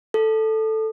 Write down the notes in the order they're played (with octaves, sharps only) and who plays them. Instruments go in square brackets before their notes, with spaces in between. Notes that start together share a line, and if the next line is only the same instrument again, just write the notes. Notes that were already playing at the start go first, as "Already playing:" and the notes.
[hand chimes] A4